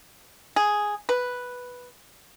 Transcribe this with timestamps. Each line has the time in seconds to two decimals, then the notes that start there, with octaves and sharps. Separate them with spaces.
0.56 G#4
1.09 B4